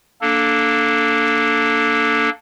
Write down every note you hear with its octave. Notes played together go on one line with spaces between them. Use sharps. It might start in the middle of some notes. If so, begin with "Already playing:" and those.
A#3 D4 A4